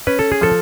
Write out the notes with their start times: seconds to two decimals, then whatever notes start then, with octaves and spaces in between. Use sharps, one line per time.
0.07 C#4 B4
0.19 A4
0.32 G#4
0.41 F3 A4